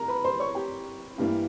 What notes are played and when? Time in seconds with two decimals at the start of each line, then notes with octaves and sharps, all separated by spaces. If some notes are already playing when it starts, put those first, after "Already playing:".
Already playing: C3 A#4 A#5
0.08 B4 B5
0.24 C5 C6
0.40 C#5 C#6
0.55 G4 G5
1.18 G2 E3 G3 A#3